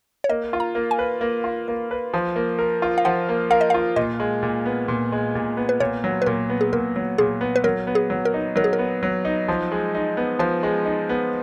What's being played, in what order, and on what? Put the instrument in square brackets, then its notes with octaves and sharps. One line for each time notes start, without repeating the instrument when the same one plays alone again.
[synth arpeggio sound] C#5
[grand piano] A#3 [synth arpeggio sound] D#5
[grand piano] F4
[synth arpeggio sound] A#5
[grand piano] A#3
[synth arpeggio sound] G#5
[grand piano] B4
A#3
F4
A#3
B4
F3
A#3
A#4
F4
[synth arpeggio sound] F5
[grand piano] F3 [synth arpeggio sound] F#5
[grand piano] A#3
[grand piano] A#4 [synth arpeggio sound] F5
[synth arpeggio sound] D#5
[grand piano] F4 [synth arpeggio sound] F5
[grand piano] A#2 [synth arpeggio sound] D#5
[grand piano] G#3
A#2
B3
A#2
G#3
A#2
B3
[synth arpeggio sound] B4
[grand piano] A#2 [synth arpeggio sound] C#5
[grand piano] F#3
[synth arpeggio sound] B4
[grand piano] A#2 [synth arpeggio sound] A#4
[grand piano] B3
[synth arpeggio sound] G#4
[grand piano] A#2 [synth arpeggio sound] A#4
[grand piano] F#3
[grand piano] A#2 [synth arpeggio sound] G#4
[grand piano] B3
[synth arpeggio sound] B4
[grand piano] F#3 [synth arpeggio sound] A#4
[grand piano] B3
[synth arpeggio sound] G#4
[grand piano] F#3
[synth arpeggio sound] A#4
[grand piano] D#4
[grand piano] F#3 [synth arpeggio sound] A#4
[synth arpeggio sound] G#4
A#4
[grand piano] B3
F#3
D#4
F3
G#3
D#4
B3
[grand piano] F3 [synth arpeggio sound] B4
[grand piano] G#3
D#4
B3